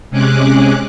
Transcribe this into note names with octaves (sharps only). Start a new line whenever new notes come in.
C3 G#3 C#4 G#4 D6 F#6